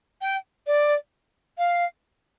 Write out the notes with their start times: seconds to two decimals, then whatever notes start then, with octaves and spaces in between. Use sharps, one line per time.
0.21 G5
0.67 D5
1.58 F5